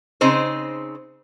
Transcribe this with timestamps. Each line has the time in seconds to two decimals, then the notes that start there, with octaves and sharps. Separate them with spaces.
0.21 C#3 C4 D#4 C5